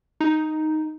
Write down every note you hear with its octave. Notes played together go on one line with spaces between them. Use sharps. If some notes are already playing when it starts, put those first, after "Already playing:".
D#4